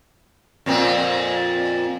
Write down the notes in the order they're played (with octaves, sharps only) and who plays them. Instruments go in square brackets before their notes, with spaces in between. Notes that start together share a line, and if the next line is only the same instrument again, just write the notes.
[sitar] F2 A#2 C4